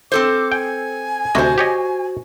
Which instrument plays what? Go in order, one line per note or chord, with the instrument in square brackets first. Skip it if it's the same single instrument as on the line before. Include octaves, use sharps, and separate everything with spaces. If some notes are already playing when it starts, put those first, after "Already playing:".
[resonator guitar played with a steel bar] C4 A4 C5 [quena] D6
[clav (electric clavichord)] G5 [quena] G#5
[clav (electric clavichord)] D2 C3 D#5 [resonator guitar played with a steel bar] F#4 C5
[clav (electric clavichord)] G4 C#5 D#5